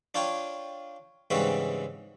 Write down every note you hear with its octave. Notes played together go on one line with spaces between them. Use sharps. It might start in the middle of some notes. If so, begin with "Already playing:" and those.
D4 F4 C#5 G5
G#2 C#3 E3 G3 C4 F#4